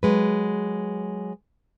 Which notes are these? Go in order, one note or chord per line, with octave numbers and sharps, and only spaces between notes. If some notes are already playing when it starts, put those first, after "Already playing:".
F#3 G#3 B4